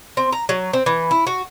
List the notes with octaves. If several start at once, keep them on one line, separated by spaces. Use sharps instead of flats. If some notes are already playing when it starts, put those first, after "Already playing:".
C4
A#5
F#3
C4
E3
E4
F#4